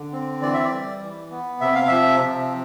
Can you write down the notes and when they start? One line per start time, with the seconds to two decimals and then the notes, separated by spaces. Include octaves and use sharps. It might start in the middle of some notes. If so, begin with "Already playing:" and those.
Already playing: D3
0.12 C4
0.42 E3 D5
0.53 E5
0.65 D5
0.72 G3
1.01 E3
1.31 B3
1.61 C3 E5
1.75 F5
1.88 F3 E5
2.21 C3